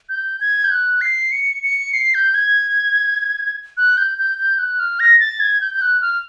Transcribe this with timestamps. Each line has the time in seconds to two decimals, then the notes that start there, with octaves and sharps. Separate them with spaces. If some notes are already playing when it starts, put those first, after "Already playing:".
0.09 G6
0.41 G#6
0.64 G6
0.71 F#6
1.01 C7
1.32 C#7
1.63 C#7
1.93 C7
2.14 G6
2.34 G#6
3.77 F#6
3.97 G6
4.18 G6
4.38 G6
4.59 F#6
4.80 F6
5.00 A#6
5.20 A6
5.40 G#6
5.61 G6
5.74 G6
5.82 F#6
6.02 F6